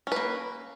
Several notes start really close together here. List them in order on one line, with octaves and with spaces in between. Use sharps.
C#4 B4 A#3